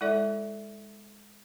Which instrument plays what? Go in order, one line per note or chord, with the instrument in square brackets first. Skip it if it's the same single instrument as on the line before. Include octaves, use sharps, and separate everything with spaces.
[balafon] G#3 E4 A4 D5 E5